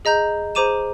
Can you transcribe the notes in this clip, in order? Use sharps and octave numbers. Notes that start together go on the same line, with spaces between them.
G#4 D#5 A#5 G6
G#4 C5 A#5 D6 D#7 E7